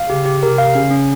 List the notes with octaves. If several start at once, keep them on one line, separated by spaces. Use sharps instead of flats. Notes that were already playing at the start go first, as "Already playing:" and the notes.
Already playing: F5
C#3 G4
G4
C3 A#4
F5
C#3 C#4
C#4